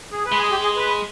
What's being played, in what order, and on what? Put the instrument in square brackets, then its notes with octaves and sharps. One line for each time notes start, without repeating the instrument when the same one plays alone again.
[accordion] G#4
B4
[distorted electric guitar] G#3
[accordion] G#4
G4
G#4
B4